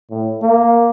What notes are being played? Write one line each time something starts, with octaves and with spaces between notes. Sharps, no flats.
A2
A#3